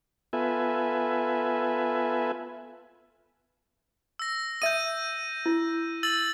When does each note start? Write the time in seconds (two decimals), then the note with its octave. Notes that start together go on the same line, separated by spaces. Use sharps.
0.33 B3 F4 A4 B4 E5 G#5
4.19 E6 A#6
4.62 E5 D#6 G6 D#7
5.46 E4
6.03 E6 A6 F#7